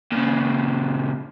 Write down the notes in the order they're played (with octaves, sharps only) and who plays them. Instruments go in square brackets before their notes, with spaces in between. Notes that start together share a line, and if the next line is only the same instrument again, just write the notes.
[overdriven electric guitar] A#2 C#3